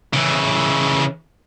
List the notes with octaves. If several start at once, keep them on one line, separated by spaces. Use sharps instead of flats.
C#3 E3